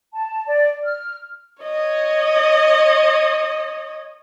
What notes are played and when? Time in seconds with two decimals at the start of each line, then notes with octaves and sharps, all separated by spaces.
0.12 A5
0.46 D5
0.84 F6
1.63 C#5 D#5